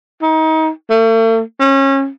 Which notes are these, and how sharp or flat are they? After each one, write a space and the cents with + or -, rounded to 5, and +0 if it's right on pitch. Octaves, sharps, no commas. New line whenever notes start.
D#4 +30
A3 +45
C#4 -30